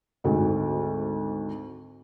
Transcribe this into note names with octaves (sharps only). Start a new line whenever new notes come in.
G#1 D2 G#2